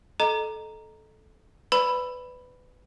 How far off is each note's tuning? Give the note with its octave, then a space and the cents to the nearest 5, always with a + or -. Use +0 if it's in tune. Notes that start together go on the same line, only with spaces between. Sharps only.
A4 -15 D#5 -15 A#5 +0
B4 +20 D5 -5 B5 +0